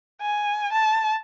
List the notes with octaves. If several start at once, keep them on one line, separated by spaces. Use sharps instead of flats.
G#5
A5